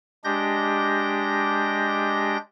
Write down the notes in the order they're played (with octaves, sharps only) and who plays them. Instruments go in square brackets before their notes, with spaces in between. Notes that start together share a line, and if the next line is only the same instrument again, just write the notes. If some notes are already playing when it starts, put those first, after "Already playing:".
[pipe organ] G#3 D4 G4 G6 A#6